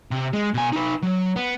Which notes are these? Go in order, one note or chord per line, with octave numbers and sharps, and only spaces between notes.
C3
G#3
B2 G#5
D#4 B4
F#3
B3